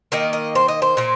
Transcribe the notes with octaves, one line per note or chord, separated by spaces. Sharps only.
D#3 A#3 D#5
D#5
C5
D#5
C5
A#2 A#3